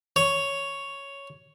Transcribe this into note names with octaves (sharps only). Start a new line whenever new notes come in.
C#5